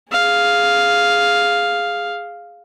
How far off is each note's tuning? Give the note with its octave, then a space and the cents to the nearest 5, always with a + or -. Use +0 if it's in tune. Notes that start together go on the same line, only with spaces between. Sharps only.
G#4 +0 F5 +0